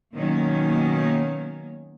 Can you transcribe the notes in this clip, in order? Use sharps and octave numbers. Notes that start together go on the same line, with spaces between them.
B2 D#3 F#3 A#3 C#4